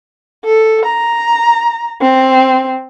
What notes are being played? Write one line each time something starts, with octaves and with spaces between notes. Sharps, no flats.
A4
A#5
C4